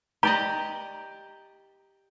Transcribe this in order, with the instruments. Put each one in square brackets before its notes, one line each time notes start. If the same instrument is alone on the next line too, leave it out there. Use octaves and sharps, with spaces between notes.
[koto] G4 D5 D#5 [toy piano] A#5